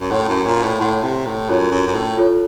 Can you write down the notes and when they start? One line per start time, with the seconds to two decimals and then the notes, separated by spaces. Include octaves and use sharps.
0.01 F#2
0.11 A2 C#5 F#5 C6
0.29 F#2
0.46 A#2
0.63 A2
0.80 A2 C#5 F#5 C6
1.03 C3
1.26 A2
1.49 F#2 F4 A4 C#5
1.71 F#2
1.87 F#2
1.95 A2
2.17 F4 A4 C#5